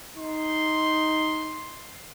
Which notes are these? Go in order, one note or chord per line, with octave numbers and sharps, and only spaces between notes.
D#4 C6